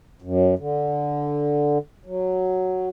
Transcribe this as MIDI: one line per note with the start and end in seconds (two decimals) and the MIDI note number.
0.22 0.55 42
0.59 1.78 50
2.06 2.89 54